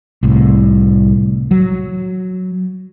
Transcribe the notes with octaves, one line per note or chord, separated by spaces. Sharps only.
C2 A2
F#3